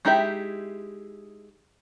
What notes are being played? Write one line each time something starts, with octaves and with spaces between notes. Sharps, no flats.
G#3 D#4 E4 G4 E5